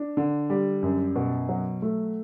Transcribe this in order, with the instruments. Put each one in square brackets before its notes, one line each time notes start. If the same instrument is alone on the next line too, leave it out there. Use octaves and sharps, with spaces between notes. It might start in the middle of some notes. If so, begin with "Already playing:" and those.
Already playing: [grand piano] D4
D3
G3
F#2
B2
F#3
A3